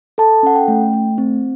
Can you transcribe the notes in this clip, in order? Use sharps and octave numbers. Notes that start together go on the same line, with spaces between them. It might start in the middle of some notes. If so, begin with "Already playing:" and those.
A4 A5
C#4 F#5
G5
A3
A3
C4